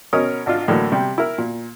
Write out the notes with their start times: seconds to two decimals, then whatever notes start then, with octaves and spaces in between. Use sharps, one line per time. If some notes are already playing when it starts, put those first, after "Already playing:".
0.13 B2 C#4 A#4 D#5 D#6
0.46 G#1 D4 F4
0.68 A2 D3 E3 F#3 A#3
0.92 C3 G3
1.18 E4 A#4
1.38 A#2